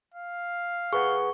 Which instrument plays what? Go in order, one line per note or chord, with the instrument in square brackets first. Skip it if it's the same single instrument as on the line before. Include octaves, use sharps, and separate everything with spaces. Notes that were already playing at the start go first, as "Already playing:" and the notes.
[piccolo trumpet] F5
[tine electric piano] G#4 B4 F#5 [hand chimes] C#6